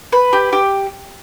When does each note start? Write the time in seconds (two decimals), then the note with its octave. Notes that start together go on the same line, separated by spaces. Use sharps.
0.12 B4
0.33 G4
0.53 G4